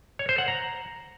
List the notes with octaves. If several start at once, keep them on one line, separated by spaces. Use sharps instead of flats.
C#5
C5
F#5
A#5